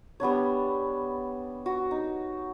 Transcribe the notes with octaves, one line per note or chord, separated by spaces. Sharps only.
G3 B3 D4 C#5
F#4
D#4